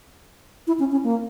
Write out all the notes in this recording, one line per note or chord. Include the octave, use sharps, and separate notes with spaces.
E4
C#4
C#4
A#3